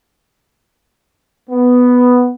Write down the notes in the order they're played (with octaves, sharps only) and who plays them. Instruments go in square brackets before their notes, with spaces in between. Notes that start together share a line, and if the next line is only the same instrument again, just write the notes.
[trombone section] B3